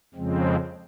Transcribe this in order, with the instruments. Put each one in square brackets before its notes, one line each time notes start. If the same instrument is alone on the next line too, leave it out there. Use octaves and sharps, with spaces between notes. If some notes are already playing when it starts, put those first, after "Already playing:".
[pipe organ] F2 C#3 F3 G#3 C4